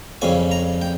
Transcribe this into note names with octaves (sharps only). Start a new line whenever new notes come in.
F2 C#3 G3 G#5
A#5
G5